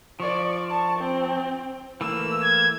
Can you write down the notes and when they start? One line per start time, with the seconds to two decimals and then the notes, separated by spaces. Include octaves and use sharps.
0.20 F3 D5 C#6
0.70 A5 C#6
0.99 C4
2.01 E3 A3 A#3 E6
2.43 G#6